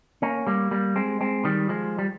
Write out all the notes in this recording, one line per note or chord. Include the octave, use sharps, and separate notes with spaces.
A#3 C#4
G3 A#3
G3 A#3
G#3 C4
G#3 C4
D#3 G3
F3 G#3
G3